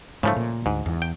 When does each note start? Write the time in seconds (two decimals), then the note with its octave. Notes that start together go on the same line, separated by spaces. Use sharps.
0.23 G#2 C#3 F3 A3
0.36 A#2
0.66 D2 G#2
0.86 E2
1.02 G5